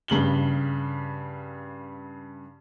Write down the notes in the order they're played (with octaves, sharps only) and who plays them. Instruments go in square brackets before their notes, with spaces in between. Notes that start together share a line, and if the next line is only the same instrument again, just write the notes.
[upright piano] G2 C#3 F#7 G7